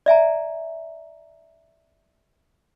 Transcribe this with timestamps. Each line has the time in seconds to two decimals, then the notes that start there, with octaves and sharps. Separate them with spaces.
0.06 D5 E5 G#5 A#5